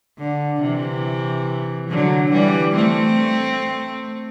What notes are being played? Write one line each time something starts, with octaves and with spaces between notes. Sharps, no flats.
D3
C3 E3
D3 F#3
E3 G3
A3 C4